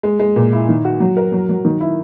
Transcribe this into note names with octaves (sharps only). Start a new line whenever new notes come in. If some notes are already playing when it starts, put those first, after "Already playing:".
G#3
G#3
A#2
E4
D#3
F#4
F#3
A#4
F#3
F#3
D#3
E4